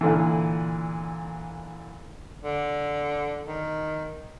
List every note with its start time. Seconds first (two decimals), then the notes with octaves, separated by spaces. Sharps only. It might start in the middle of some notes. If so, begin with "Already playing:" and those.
0.01 A#2 D3 E3
2.42 D3
3.47 D#3